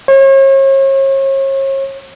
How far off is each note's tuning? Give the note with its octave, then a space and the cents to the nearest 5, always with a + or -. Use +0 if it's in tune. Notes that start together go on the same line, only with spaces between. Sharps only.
C#5 -40